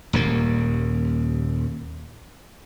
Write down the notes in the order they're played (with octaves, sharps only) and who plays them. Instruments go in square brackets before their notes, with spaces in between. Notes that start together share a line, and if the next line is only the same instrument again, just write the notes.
[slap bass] D#1 D#2 A#3